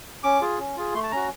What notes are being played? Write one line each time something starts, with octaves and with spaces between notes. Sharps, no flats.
C#4 D6
F4 G#4
C#4
F4 G#4
A3 C6
A5
C#4 F#4 A#5